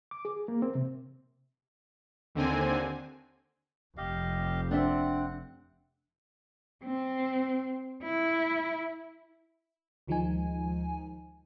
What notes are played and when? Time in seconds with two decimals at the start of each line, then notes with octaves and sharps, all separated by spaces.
0.11 D6
0.25 G#4
0.48 A#3
0.62 C4
0.75 C3
2.35 D#2 D3 C4 G#5
3.97 F1 G4 D#5 F5
4.71 C4 D4 C5 E5 F#5
6.84 C4
8.03 E4
10.07 D2 D#3 F3 G#3 D#4 G#5